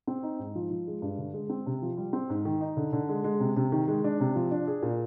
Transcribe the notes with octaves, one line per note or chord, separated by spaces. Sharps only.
C4
D#4
G#2
F3
F3
G#3
G2
D3
G#3
C4
C3
F3
G3
C4
G#2
D#3
D#4
D3
D3
G#3
G#3
C3
C3
D#3
G#3
D4
C3
F3
D4
G#4
A#2